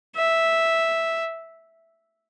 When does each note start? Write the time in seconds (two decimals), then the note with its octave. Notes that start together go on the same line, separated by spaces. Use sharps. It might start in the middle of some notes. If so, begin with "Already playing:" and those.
0.16 E5